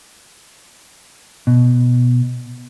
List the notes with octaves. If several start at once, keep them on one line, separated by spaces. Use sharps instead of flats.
B2